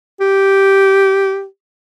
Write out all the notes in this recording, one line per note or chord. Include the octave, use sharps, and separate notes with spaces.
G4